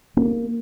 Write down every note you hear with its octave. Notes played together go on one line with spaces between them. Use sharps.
A#3